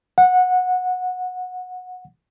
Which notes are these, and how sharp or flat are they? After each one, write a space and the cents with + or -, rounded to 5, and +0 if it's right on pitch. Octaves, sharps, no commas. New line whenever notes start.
F#5 -20